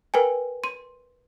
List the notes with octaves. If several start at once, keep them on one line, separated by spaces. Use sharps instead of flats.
A#4 B4 G5 G#5
C6 D#7